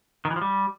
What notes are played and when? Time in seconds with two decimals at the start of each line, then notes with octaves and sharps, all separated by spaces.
0.25 D#3
0.30 E3
0.36 F3
0.42 G3